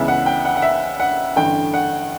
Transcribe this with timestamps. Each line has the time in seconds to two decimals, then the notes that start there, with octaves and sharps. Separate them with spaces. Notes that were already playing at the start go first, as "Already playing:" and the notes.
Already playing: C#2 C#3 E3 B3 E5
0.08 F#5
0.26 G5
0.45 F#5
0.57 F#5
0.62 E5
1.00 F#5
1.36 A1 G2 D3 G5
1.74 F#5